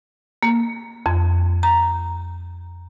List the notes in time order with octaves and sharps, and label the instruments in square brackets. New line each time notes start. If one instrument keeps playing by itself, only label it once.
[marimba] A#3
F2
A#5